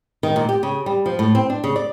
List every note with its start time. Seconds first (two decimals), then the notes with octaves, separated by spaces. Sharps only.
0.23 D#3
0.36 A#2
0.49 G4
0.63 C#3
0.86 G3
1.06 F3
1.19 A2
1.35 C4
1.50 D4
1.64 C#3
1.76 D5